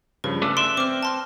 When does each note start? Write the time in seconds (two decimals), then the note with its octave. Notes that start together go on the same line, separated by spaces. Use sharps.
0.24 G2 C#3 F3 B4
0.42 A3 C#4 D4 D6 E6 F#6
0.57 D5 E5 C6
0.77 C4 D6 F6
1.03 A5 C6 F6